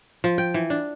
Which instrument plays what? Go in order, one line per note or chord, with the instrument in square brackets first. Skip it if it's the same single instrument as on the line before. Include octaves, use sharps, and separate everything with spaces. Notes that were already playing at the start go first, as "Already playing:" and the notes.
[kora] F3
G5
E3
D4